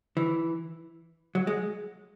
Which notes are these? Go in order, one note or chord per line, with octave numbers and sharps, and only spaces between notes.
E3
F#3
G#3